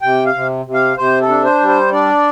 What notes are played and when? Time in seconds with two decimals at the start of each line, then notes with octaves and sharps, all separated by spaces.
0.02 C3 G5
0.26 F5
0.34 C3
0.65 C3
0.74 F5
0.97 C3 C5
1.21 A4
1.29 D4
1.45 C5
1.60 G3
1.68 C5
1.92 D4 D5